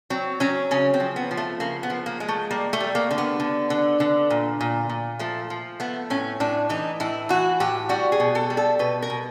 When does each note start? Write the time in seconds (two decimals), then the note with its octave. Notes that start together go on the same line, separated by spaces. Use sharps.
0.10 F#3 C4
0.40 F#3 C#4
0.71 C#3 C#4
0.94 C4
1.00 F3
1.16 B3
1.31 F3
1.37 A3
1.60 C#3 A#3
1.83 B3
1.90 F3
2.06 A#3
2.20 G#3
2.28 A3
2.50 G3 A#3
2.73 A3
2.80 G3
2.95 A#3
3.11 D3
3.18 B3
3.40 D3
3.70 D3
4.00 D3
4.30 A#2
4.61 A#2
4.89 A#2
5.19 F3 A3
5.50 F3
5.80 A3 B3
6.10 A2 C#4
6.40 A2 D4
6.69 E3 D#4
7.00 A2 E4
7.29 E3 F#4
7.60 A2 G4
7.89 G3 F#4
8.12 G#4
8.20 B2
8.35 A4
8.50 G3
8.57 A4
8.79 B2 B4
9.02 A#4
9.10 B2